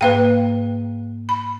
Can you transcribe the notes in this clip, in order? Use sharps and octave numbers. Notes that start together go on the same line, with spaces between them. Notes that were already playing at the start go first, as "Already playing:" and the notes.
G#2 A#3 B4 F5 G5
B5